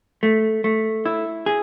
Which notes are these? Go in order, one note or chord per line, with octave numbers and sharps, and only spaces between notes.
A3
A3
E4
G#4